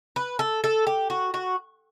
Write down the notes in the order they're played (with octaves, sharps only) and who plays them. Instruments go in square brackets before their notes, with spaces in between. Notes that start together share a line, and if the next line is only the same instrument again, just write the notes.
[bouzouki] B4
A4
A4
G4
F#4
F#4